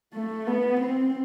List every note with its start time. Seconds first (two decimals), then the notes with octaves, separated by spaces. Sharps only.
0.14 A3
0.47 B3
0.80 C4